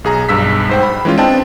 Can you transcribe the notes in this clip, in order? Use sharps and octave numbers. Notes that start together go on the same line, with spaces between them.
B1 G#4 A#5
B1 G2 E6 B6
G#2 C5 G5
B5
E3 G#3 C#4 F4
C4 D4 D#5 G5 A5